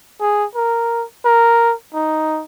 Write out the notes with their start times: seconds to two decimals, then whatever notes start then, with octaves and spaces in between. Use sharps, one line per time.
0.21 G#4
0.55 A#4
1.25 A#4
1.94 D#4